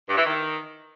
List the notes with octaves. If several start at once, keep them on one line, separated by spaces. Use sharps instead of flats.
G2
E3
D#3